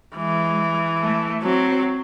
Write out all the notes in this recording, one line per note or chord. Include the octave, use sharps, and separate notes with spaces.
E3 G#3
A3
F#3 C4